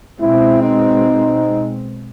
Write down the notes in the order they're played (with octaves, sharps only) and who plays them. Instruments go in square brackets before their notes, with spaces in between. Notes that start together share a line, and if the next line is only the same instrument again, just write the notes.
[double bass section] B2 G#3 C4 [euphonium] E4
[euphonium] D#4